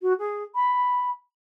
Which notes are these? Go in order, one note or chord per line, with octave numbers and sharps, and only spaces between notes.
F#4
G#4
B5